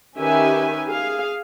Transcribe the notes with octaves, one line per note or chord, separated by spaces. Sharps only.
D#3 C#4 G4 B4 E5 G#5
G#4 F5